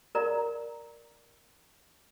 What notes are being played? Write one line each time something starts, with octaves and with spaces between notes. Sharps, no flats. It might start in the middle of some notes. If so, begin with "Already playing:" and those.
A#4 D5 A#5